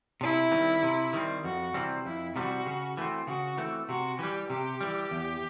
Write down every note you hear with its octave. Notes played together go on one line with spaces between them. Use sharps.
C3 E4
D#3 G3 C4
C3
D#3 G3 C4
F2 F#4
C3 E3 G3 C4
F2 E4
C3 E3 G3 C4 F#4
C#3
E3 A3 C4
C#3 F#4
E3 A3 C4
C3 F#4
E3 G3 G4
C3 G4
E3 G3
E2